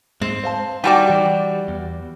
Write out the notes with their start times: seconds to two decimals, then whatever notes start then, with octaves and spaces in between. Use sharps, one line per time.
0.21 G#2 G#3 C4
0.44 C5 F5 A5
0.84 G3 D#4 F#4 D5 F#5 G5
1.07 E3 G4
1.68 E2